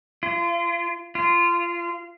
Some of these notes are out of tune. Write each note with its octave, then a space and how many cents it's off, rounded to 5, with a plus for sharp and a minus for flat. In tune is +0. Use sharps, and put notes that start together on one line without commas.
F4 -35
F4 -20